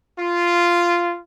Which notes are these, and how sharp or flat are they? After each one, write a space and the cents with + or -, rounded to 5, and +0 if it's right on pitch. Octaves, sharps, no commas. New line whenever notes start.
F4 -10